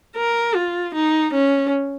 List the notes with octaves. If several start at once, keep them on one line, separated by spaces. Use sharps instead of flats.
A#4
F4
D#4
C#4